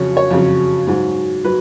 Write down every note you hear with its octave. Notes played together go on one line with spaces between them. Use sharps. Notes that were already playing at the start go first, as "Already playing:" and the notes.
Already playing: F2 C#3 F#3 C#5
C#5
F2 C#3 F#3
G#2 F#3
F#3 B4